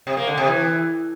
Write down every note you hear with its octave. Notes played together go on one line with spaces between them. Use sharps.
C3
A#3
D3
C3
E3